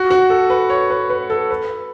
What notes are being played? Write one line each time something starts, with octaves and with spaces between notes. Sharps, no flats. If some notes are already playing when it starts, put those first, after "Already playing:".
Already playing: F#4
F#4
A4
B4
C#5
B4
B4
A4
B4